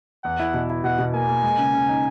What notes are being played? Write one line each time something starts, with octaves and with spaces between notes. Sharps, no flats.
E2 F#5
E4
B2
E4
B2 F#5
B2
A#3 G#5
A#3
G#3
C#3
C#3
D#4